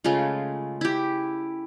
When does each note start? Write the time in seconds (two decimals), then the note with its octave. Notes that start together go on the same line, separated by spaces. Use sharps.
0.04 C#3 G#3 A3 F4
0.81 E4 G4